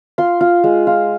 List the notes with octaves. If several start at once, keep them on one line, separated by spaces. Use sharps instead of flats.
F4 C6
F4
G#3
F4